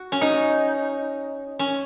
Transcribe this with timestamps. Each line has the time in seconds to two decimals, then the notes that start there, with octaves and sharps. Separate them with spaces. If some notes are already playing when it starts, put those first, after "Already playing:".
Already playing: F#4
0.12 C#4
0.21 D#4
1.59 C#4